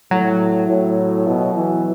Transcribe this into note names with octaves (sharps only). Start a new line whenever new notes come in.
A2 F#3
A2
B2
E3